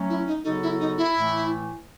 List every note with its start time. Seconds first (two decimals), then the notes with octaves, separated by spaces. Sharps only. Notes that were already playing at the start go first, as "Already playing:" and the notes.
Already playing: F#3 A3 C#4
0.10 E4
0.27 D#4
0.44 C#3 F#3 B3 D#4 F#4 A4
0.63 E4
0.80 D#4
0.98 E4
1.15 A2 E3 A3